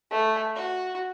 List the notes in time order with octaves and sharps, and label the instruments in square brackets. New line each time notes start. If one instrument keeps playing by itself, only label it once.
[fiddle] A3
F#4